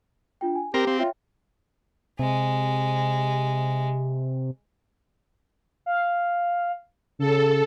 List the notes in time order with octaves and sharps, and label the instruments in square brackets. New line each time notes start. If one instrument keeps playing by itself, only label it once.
[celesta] D4 F4 G5
G#5
[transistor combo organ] C4 A#4 [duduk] G4 [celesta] A#5
[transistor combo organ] C4 [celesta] F5 A#6
[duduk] F4 [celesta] C#5 E5 G5
[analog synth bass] C3 [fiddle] G#3
[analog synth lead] F5
[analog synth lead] C#3 [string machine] A4